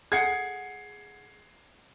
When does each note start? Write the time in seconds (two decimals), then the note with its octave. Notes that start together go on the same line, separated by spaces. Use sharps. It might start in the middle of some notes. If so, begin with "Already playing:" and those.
0.12 G#4 F#5 G#6 C7 C#7